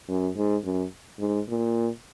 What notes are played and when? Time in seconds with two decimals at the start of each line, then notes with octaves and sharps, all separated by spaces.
0.09 F#2
0.36 G#2
0.64 F#2
1.20 G#2
1.49 A#2